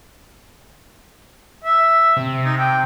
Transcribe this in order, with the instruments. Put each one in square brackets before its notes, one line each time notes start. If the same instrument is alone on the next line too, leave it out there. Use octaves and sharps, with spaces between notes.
[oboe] E5
[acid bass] C3
[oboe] D#4
G5